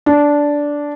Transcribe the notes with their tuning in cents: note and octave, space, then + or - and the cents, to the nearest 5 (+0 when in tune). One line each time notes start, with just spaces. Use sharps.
D4 -10